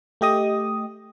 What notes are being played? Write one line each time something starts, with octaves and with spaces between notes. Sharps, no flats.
A3 G4 D#5 D#6